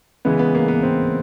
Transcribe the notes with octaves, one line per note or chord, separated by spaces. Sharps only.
C#3 E3 G#3 B3
B3
A#3
B3
C4